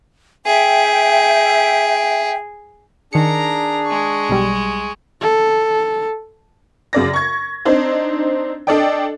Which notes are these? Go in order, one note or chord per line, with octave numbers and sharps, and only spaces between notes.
G#4 E5 G5
D#3 D4 G#4 A#4 A#5 C#7
G#3 C#6
B1 G3
A4
F#2 C#3 D5 A#6
C#6 G#6
C4 D4 D#4 C5
D4 A4 D5 D#5 G5